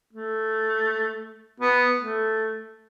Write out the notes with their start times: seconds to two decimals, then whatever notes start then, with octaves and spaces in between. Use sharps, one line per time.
0.13 A3
1.60 B3
2.00 A3